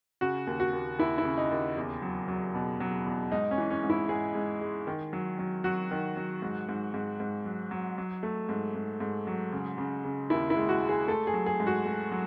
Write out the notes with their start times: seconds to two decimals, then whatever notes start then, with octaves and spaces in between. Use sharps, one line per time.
0.21 C#3 F#4
0.47 D#2
0.60 F#4
0.73 D#2
0.99 D#2 E4
1.18 E4
1.25 C#3
1.38 D#4
1.51 D#2
1.77 E2
2.02 F#3
2.28 F#3
2.55 B2
2.80 F#3
3.06 E2
3.32 G#2 D#4
3.51 C#4
3.58 E3
3.70 C#4
3.83 G#2
3.90 E4
4.09 G#2 G#4
4.35 G#2
4.61 G#3
4.87 D#3
5.13 F#3
5.39 F#3
5.64 F#3 F#4
5.91 D#3
6.17 F#3
6.42 G#2
6.69 G#2
6.94 G#2
7.20 G#2
7.45 F#3
7.71 F#3
7.98 F#3
8.23 A3
8.49 G#2
8.75 G#2
9.00 G#2
9.27 F#3
9.52 C#3
9.78 C#3
10.05 C#3
10.30 D#2 E4
10.50 E4
10.56 G#3
10.69 F#4
10.83 G#3
10.89 G#4
11.08 A3 A4
11.27 G#4
11.33 F#3
11.46 G#4
11.60 G#2
11.67 F#4
11.86 A3
12.12 F#3